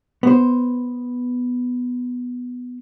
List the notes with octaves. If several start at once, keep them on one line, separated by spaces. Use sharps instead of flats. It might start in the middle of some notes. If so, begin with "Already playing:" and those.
B3 C5